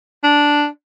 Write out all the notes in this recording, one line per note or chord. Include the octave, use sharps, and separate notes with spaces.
D4